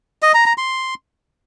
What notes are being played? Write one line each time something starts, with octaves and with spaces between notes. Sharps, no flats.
D#5
A#5
A#5
C6